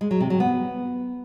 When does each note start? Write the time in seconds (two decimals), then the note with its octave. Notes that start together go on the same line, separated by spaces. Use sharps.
0.01 G#3
0.11 F#3
0.20 C3
0.30 F#3
0.40 B3